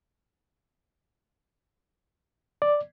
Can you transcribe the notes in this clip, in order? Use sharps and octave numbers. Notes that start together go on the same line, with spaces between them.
D5